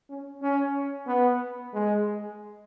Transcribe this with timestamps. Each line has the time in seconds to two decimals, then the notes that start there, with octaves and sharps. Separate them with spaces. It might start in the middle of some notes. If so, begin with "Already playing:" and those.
0.10 C#4
0.42 C#4
1.07 B3
1.73 G#3